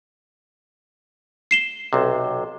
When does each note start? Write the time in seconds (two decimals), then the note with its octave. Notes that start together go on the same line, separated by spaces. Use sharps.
1.51 C7 E7 G7
1.93 B1 C3